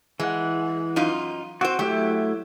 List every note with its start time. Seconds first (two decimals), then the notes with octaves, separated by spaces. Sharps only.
0.20 E3 G#3 F#5
0.96 F#2 D#4 F4
1.61 C4 F#4 C5
1.79 F#3 A3 E4 G4